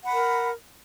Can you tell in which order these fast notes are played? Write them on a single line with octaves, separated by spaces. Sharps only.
F#5 B5 A#5 A#4